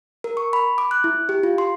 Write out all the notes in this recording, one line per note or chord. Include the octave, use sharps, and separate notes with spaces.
A#4
C#6
B5
D6
F#6
E4
G4
F4
C6